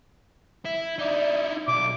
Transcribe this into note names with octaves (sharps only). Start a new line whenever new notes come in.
E4
D#4 E4 D5
B1 D6